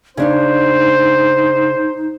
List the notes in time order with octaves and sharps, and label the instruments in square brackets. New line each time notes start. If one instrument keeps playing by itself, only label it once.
[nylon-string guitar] C#3 D4 C#5 [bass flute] D#4 [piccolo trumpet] C5